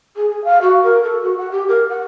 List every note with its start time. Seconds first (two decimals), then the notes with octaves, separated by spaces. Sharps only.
0.16 G#4
0.29 G#4
0.44 F5
0.61 F#4
0.83 A#4
1.03 A4
1.22 F#4
1.37 F#5
1.51 G4
1.68 A#4
1.89 F#5